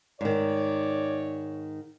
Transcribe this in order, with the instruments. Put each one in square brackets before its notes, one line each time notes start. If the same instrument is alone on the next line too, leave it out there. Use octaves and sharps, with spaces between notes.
[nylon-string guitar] G#2 D#3 [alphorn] C#5 [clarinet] D5